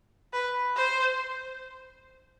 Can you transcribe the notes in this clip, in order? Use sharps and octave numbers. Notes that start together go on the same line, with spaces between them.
B4
C5